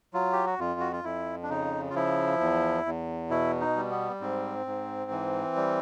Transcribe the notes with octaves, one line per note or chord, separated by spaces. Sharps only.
F#3 F4
G4
F#4
F2 F4
F#4
F4
F2 E4
D4
C#3 D#4
F4
F3 E4
E2
E2
B2 E4
D#4
G3
B3
G#2 C4
G#2
E3
G3